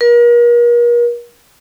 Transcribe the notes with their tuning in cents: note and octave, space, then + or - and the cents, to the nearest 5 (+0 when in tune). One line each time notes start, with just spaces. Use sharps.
A#4 +40